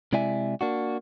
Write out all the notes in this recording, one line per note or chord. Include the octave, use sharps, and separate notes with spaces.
C3 G#3 E4 D5 E5 G#5
A#3 D4 F#4